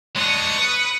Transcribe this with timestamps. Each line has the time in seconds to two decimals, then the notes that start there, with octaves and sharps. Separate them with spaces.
0.16 G#3 D4 C#6 D#6
0.59 B4